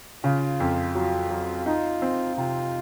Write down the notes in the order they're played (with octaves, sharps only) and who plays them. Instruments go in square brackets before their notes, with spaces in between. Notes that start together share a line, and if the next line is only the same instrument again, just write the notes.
[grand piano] C#3 [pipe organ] F4
[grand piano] F2
[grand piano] F#3 [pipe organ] F4
[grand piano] F#3
[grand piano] D#4 [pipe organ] F4
[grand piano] C4
[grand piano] C3 [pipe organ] F4